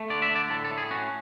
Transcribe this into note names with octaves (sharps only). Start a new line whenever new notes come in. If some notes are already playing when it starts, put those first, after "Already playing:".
Already playing: A3
D3 D5
E5
D3 D5
A2 A4
A4
A2
G#4
C#4 F#4